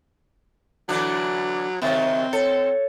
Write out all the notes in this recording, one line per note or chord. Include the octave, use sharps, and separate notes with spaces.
D3 E3 F#3 D4
C3 D#3 F#3 C4 E5
A4 C#5